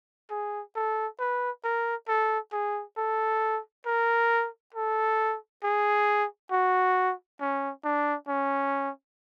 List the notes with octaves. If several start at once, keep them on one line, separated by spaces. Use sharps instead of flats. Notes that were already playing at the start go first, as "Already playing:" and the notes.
G#4
A4
B4
A#4
A4
G#4
A4
A#4
A4
G#4
F#4
C#4
D4
C#4